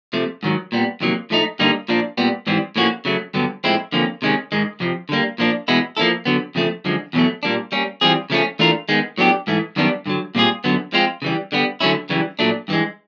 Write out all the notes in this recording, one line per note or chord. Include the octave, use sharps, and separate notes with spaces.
C3 F3 A3
G#2 D#3 F#3
A#2 G3 B3
F2 C3 D#3 F#3 A#3
A2 F3 A3 C4 D#4
G2 D3 G3 A#3 D#4
A#2 F3 A#3 D4
A#2 G3 B3
G#2 E3 G3 C4
A2 F3 A#3 C#4 F#4
C#3 F#3 A3
G2 D3 F#3 B3
A2 F3 G#3 C4 E4
F2 D3 F3 A#3 C#4
C3 D#3 G#3 C#4
G#2 D#3 G#3
F2 C3 F3
D3 G3 A#3
A#2 F3 A#3 D4
E2 B2 G#3 B3 E4
F3 A#3 C#4 E4 A4
D3 F#3 B3
F2 C#3 F3 A3
F#2 D3 F3 G#3
E2 B2 F#3 A3
A#2 G3 A#3 D4
G3 A#3 C#4
E3 G3 C4 F4 G#4
C#3 F3 A3 C#4
E3 A3 D4 F4 A#4
D#3 G#3 B3
A2 F#3 B3 D4 G4
G#2 E3 A3
F#2 D#3 G3 B3 D4
G2 D3 F#3
A#2 G3 C4 F4 G#4
F#2 D3 F#3 B3
F3 G#3 C4 F4
C#3 E3 G3
D3 G3 B3
D3 F#3 A3 C#4 E4
F#2 C#3 E3 G3
A#2 F#3 A3 D4
G2 E3 G#3